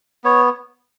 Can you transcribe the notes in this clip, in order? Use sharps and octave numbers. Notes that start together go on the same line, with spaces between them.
B3 C#5